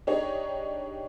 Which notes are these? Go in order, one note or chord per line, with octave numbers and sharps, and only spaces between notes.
D4 D#4 G4 G#4 C#5 D#5